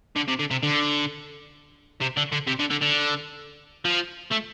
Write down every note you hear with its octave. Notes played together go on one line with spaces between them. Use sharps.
D3
C3
D3
C3
D3
C3
D3
D3
C3
D3
D3
D3
F3
A3